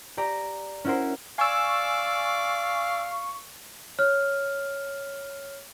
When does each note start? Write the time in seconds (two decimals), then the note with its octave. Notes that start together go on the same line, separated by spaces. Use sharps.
0.17 G4 D5 A#5
0.85 C#4 E4 F#4 A#4 C5
1.38 D5 F5 G#5 C#6 E6
3.99 C#5 F6